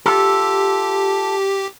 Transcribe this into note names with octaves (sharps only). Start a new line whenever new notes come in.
F4 G4 A4